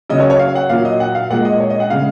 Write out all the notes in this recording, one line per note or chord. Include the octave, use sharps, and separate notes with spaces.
C#3 F#3 D#5
C#5
C#5
F5
F#5
A#2 F#3 F5
D#5
F#5
F5
A#2 G#3 F#5
D#5
C#5
D#5
F#5
C#3 G#3 F5